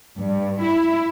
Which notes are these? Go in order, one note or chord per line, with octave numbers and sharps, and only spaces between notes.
G2
E4